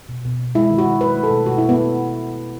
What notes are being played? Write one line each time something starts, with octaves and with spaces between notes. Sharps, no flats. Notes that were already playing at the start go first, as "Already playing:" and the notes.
B2
B2
B2
G#3 E4
D#3
F#4
D#3
F#3 B4
A3
A4
B2
B2 F#4
E4
B2
B3